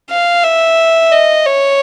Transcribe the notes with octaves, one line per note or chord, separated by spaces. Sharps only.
F5
E5
D#5
C#5